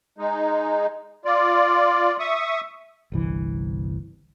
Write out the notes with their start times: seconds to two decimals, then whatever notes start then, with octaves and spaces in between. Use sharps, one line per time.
0.18 G#3 D#4
1.25 F4 D5
2.19 E5 C#6 D#6
3.12 G1 C2 E3